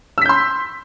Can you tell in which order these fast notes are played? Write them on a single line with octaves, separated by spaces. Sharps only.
E6 B6 G6 C6